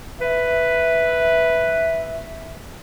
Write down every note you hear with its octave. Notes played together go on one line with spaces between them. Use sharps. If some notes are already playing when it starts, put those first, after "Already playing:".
B4 E5